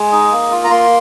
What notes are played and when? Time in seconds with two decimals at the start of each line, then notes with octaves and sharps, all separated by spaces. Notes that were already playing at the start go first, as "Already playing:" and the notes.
Already playing: G#3
0.12 D#4
0.31 A#3
0.51 F4
0.64 A#5
0.70 A#3 C6